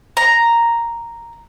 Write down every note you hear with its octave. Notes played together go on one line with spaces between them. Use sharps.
A#5